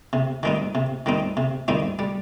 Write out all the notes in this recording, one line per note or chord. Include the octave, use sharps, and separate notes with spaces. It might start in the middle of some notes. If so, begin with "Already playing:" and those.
C3
D#3 G3 C4 D#4
C3
D#3 G3 C4 D#4
C3
D#3 G3 C4 D#4
G3